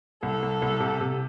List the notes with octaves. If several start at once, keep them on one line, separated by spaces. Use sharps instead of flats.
C2 A4
C2
C2
C3
C3